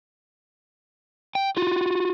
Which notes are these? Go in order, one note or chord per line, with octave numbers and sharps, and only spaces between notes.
G5
F4 F#4